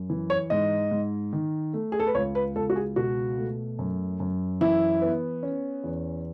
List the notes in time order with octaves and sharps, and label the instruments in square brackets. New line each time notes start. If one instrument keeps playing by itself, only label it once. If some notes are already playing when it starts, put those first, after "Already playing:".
Already playing: [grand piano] F#2
E3
C#5
G#2 D#5
G#2
D#3
A3
G#4
A4
B4
C#2 C#5
B4
C#2 A4
F#4
G#4
B2 F#4
A3
F#2
F#2
E3 E4
B3
C#4
E2